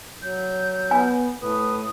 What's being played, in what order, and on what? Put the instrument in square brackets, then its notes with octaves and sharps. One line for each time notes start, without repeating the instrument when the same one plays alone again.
[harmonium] F#3 [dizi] G6
[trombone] B3 [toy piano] G#5
[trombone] A2 [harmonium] B4 [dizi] D#6